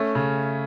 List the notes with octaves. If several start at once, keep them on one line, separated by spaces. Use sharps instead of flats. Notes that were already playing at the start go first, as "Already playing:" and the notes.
Already playing: A3 C#4
C#3